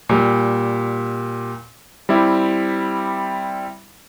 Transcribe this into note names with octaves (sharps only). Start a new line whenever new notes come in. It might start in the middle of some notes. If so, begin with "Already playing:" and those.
A#2 G3
G3 C4 E4 G4